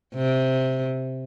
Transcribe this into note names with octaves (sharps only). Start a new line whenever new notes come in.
C3